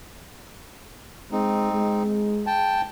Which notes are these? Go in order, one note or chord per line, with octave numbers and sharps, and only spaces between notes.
G#3 C4 D#4
G#3
G5 A5